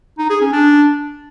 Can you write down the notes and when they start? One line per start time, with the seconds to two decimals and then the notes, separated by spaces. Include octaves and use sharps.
0.19 D#4
0.30 G#4
0.41 C#4
0.52 D4